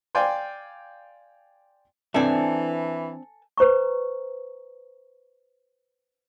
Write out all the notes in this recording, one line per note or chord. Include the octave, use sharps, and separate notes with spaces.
D5 F5 G5 G#5 C6
E3 C4 D4 A4 E5 G#5
B4 C5 A#5 C#6